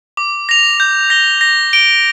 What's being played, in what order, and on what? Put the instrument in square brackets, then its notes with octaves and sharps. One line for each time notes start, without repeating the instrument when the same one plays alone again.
[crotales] D6
A#6 F7
G6
A#6 G7
A#6
D7 G7